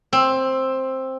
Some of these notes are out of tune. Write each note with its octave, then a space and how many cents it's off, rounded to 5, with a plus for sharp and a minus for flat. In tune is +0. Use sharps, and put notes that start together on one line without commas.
C4 +10